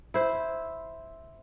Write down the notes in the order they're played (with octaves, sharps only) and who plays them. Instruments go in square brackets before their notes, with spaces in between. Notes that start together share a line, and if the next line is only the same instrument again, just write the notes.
[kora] E4 C5